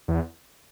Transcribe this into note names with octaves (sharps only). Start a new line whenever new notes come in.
E2